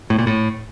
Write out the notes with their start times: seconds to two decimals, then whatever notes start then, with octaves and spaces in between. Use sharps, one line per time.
0.10 A2
0.19 A#2
0.27 A2